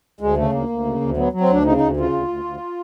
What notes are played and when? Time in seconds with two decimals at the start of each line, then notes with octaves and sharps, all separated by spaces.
0.20 D2 G#3
0.37 C#3 A3
0.53 D2 A#3
0.69 D2
0.85 C#3
1.01 D2
1.17 F#3 B3
1.33 F#3
1.41 C4
1.49 D2 D4
1.65 C#3 D#4
1.77 D2 D#4
1.97 C#3 F4
2.13 D2
2.28 D2
2.44 D2